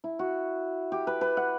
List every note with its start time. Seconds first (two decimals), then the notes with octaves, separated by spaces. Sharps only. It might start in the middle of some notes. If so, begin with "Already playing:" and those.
0.04 E4
0.19 F#4
0.92 G4
1.07 B4
1.21 B4
1.37 F#5